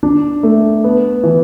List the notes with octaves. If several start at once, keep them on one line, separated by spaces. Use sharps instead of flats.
D4
A3
B3
E3